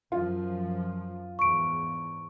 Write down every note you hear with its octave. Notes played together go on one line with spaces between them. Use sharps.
F#2 F3 F4
E2 G#2 C#6 D7